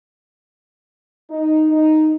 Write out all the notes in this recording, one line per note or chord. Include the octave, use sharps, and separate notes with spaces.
D#4
D#4